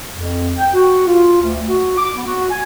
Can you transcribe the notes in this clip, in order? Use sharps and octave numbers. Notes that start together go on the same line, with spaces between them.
F2
G5
F#4
F4
D2
F#4
D6
B3
F#4
G#5